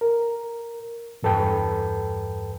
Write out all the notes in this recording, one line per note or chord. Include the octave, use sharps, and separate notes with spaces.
A#4
E2 G2 A4 B4 G5